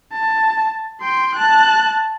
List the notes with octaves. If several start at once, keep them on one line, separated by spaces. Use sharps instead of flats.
A5
G5 C6
A5 F#6